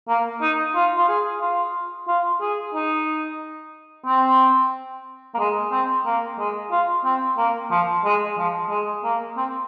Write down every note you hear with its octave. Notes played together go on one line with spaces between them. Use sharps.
A#3
D#4
F4
F4
G#4
F4
F4
G#4
D#4
C4
A#3
G#3
C4
A#3
G#3
F4
C4
A#3
F3
G#3
F3
G#3
A#3
C4